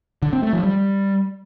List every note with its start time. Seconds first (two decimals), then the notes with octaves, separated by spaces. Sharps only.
0.22 D3
0.33 C4
0.43 A3
0.53 F3
0.63 G3